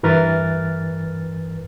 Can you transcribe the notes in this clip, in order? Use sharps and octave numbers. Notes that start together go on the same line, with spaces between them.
G2 E3 A#4 B4 F6 A6